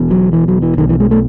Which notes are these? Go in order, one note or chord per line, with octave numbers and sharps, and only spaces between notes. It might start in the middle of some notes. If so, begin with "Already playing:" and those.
Already playing: E1 E2 B2
F#3
E3
F#3
E3
B1 B2 D#3
E3
G#3
A3